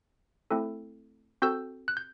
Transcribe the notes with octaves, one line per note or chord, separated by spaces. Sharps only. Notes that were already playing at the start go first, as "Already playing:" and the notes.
A3 C4 E4 A4
C4 F#4 A4 E6 G6
F#6
G6